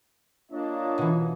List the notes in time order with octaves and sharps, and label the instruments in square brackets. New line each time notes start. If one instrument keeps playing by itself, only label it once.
[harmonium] A#3 D4 [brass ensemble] F4 C#5 D#5
[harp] B2 E3